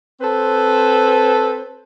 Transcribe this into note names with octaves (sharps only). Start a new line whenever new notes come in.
C4 A4 B4 C5